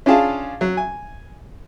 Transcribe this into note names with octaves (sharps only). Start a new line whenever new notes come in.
C#4 D4 F4 G#4 F5 A5
F#3
G#5